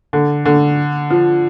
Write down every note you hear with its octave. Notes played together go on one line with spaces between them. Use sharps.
D3
D3
F3